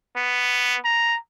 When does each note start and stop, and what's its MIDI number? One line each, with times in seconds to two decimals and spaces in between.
0.16 0.77 59
0.85 1.18 82